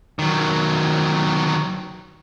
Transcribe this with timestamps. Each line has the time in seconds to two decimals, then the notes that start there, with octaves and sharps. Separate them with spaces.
0.19 D#3 F#3